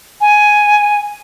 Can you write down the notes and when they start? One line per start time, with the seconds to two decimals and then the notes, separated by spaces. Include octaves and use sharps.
0.21 G#5